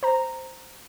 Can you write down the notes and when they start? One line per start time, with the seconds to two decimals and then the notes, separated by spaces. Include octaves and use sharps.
0.03 C5 A#5